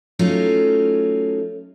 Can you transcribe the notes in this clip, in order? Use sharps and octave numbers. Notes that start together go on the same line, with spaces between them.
F#3 A3 C#4 D#4 F4